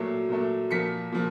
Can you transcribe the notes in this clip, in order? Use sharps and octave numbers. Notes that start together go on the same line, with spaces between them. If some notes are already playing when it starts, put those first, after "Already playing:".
Already playing: A#2 F#3 A3 C7
A#2 F#3 A3
A#2 F3 A#3 B6 C#7
A#2 F3